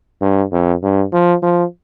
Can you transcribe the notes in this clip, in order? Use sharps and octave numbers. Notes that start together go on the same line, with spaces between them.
G2
F2
G2
F3
F3